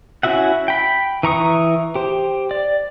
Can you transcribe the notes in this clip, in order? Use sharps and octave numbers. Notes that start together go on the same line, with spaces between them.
C#4 E4 F#4 E5 F#5
G5 B5
E3 A#5 C#6 D#6
G4 C5
D5